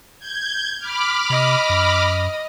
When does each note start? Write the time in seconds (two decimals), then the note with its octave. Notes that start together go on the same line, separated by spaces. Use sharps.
0.19 G6 G#6
0.79 B5 D6 F6
1.30 C3 D#5
1.69 F#2